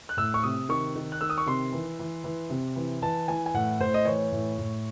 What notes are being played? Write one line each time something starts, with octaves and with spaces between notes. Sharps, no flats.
F#6
A2 E6
C#6
C3 D#6
D#3 C#6
D#3
F#6
D#3 E6
D#6
C#6
C3 C6
E3
E3
E3
C3
E3
E3 A5
E3 G#5
G#5
A2 F#5
A2 C5
D#5
E3 C#5
A2
A2